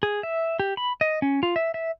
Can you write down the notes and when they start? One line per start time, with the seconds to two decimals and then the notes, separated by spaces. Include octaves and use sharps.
0.03 G#4
0.23 E5
0.60 G4
0.77 B5
1.01 D#5
1.22 C#4
1.43 F4
1.56 E5
1.74 E5